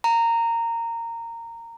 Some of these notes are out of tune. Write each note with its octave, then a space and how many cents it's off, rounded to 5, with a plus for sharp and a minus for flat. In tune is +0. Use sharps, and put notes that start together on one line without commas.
A#5 -15